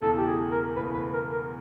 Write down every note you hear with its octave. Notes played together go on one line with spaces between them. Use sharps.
E1 E2 C#3 E3 A3 A4
G4
G#4
A#4
E1 E2 C#3 E3 A3 B4
B4
A#4
A#4